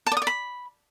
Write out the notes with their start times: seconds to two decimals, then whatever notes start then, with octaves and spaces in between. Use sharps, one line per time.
0.07 A5
0.12 D5
0.17 D#6
0.22 D5
0.27 B5